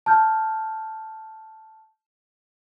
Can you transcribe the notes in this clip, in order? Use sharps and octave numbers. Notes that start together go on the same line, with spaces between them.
A5 F6 G6